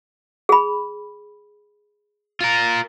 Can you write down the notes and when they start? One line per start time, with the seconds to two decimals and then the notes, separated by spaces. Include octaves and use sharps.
0.49 G#4 B5
2.41 F4 A#4